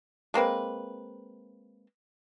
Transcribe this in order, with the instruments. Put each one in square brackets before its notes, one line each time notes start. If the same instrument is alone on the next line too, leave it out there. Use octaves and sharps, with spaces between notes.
[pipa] G#3 A#3 C4 B4